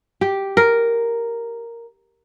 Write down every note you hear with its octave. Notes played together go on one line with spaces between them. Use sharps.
G4
A#4